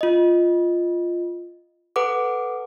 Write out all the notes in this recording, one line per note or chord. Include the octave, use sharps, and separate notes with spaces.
F4 D#5
A4 B4 F#5 D6